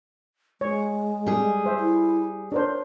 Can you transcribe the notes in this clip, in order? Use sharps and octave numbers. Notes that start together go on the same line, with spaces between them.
G#3 C#5
G3 G#4
C5 E5
E4
D4 A#4 C5 C#5